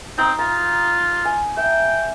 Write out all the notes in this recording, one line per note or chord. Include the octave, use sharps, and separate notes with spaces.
C4 D#4 A#5
F4 A#5
G#5
E5 G5